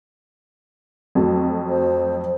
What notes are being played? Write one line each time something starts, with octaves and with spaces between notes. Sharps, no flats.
F2 F#3 A3
C5